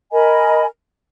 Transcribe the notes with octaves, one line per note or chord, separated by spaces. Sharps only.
A#4 D#5 G#5 B5